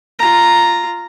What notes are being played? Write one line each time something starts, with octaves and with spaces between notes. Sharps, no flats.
F4 A#5